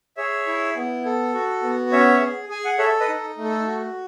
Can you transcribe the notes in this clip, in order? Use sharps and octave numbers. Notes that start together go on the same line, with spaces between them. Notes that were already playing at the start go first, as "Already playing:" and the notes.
G#4 C#5 E5
E4
B3
A4
F#4
B3
C#4 C#5 E5
G#4
G#4 G#5
F#5
A4 C#5 E5
B4 D#5
D#4
A3
A4
F#4